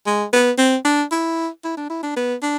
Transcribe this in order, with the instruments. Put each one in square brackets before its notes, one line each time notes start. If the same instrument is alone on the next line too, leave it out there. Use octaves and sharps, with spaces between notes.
[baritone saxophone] G#3
B3
C4
D4
E4
E4
D4
E4
D4
B3
D4